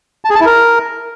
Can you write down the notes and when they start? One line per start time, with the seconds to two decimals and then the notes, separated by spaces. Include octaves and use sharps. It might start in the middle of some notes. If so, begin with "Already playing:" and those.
0.25 A5
0.30 G#4
0.35 A5
0.41 E4
0.46 A#4